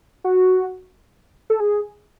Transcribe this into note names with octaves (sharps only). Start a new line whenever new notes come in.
F#4
A4
G#4